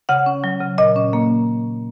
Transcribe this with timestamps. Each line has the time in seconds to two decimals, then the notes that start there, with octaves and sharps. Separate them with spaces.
0.09 C#3 F#5
0.26 C#4
0.44 F#3
0.61 C#3
0.78 A#2 D#5
0.96 C#4
1.13 A#3